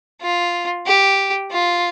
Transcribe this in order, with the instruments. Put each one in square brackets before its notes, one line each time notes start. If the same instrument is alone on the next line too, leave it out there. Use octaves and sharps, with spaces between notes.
[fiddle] F4
G4
F4